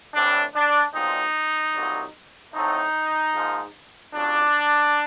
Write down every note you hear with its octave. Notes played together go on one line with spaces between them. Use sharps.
A2 E3 G3 C4 D4
D4
B1 A#2 F3 G#3 C4 D#4
C2 A#2 F#3 B3
A2 F#3 A3 C4 D#4
G#2 F3 A#3
F2 C#3 F#3 D4